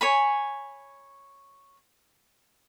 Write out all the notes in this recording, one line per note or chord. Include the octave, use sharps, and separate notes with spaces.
C#5 G#5 B5